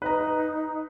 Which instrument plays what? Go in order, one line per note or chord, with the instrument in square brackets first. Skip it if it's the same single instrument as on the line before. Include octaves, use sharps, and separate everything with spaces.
[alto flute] D#4 [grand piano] B4 A#5